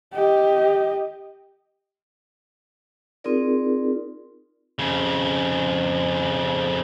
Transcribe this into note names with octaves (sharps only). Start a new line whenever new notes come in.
G4 D#5
C4 D#4 F4 G#4 A#4 D5
F2 C#3